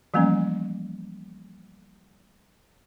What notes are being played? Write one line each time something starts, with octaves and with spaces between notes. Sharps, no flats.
E3 F3 G3 A3 A#3 C#4